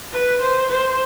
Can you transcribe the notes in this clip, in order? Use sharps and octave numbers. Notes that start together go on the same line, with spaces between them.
B4
C5
C5